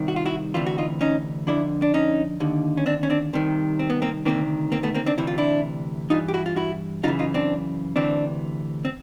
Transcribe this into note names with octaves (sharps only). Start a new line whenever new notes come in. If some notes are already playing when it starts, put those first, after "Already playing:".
Already playing: C2 C3 D#3
F#4
F4
E4 F#4
D2 C3 E3 F4
F#4
D#4 F4
C#4 D#4
F2 D3 D4 E4
D4
C#4 D#4
D#2 D3
C#4
C4 D4
C#4
C4 D4
C2 C3 D#3
C4
B3
A#3 C4
D2 C3 D#3 A#3 C4
A#3 C4
A3 B3
A#3 C4
C4 D4
D2 C3 E3 E4
F4
D4 E4
G2 E3 D#4 F4
G4
E4 F#4
F4
E4 F#4
F#2 C#3 E3 D#4 F4
D#4 F4
C4 D4
D2 C3 E3 C4 D4
C4